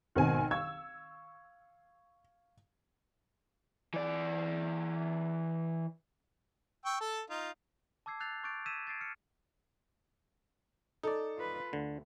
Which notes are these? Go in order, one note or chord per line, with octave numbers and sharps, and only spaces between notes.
G#1 B2 D#3 C4 C5 G#5
F5 C#6 E6 G#6
E3 D5
G5 C#6 E6
A4 A5
D#4 F4
A5 D6 E6 G#6 C7
E6 F#6 G6 A6 C7 F7
C#6 D6 F#6 G6 A6 D7
E6 G#6 B6 D#7 E7
G#6 A6 C7 D7
F6 C#7
D#4 A4 D5
F4 B4
D2 D3